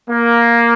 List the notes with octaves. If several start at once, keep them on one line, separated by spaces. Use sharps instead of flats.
A#3